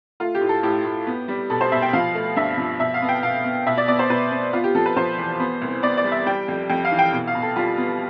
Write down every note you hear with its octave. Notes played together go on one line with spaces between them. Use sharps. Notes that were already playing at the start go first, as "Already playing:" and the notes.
A3 F4
G4
A2
A4
A2 G4
A2
B3
G3
B2 A4
C5
B2 E5
G5
F3 F5
A3
G2 E5
F3
B2 E5
F5
B3
G5
B2 F5
B3
B2 E5
D5
B3 D5
C5
B2 B4
B3
B3 F4
G4
F3 A4
B4
F3 C5
E2
B3
C2
B3 D5
D5
G3
E5
G3 G5
F2
F2 G5
F5
E3
G5
B2
F5
B2
A4
G3 F4
B3